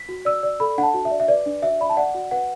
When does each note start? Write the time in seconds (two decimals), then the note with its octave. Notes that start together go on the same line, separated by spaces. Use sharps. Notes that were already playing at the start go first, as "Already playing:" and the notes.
Already playing: B6
0.09 F#4
0.25 D5 E6
0.43 D5
0.60 A4 B5
0.78 D4 F#5
0.83 A5
0.94 F#4
1.05 E5
1.11 D5
1.20 E5
1.28 B4 D5
1.46 D4
1.62 F#4 E5
1.80 D5 B5
1.90 A5
1.97 D5 F#5
2.14 F#4
2.31 B4 F#5